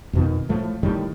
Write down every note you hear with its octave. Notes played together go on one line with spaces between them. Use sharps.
F2 B2 D#3
A2 F3 A3
A2 D#3 G3